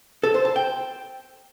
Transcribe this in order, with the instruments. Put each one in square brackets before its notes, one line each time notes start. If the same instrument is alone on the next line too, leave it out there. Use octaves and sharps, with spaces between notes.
[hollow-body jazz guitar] A4
C5
A5
G5